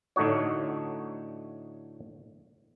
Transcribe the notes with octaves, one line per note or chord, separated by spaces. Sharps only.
A2 D3 A3 D#4 F#4 C#5